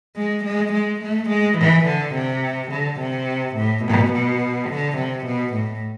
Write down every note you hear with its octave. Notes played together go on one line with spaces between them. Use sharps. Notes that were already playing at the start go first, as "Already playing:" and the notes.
G#3
G#3
G#3
A3
G#3
E3
D3
C3
D3
C3
A2
B2
B2
D3
C3
B2
A2